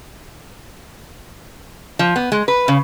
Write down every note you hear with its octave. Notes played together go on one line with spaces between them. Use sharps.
F3
B3
G#3
B4
C#3